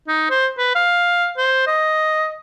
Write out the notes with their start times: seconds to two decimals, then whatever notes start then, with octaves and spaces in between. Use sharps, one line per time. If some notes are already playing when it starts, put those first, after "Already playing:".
0.08 D#4
0.30 C5
0.58 B4
0.75 F5
1.37 C5
1.67 D#5